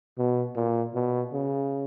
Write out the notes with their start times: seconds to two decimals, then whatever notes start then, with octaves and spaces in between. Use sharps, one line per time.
0.18 B2
0.56 A#2
0.95 B2
1.33 C#3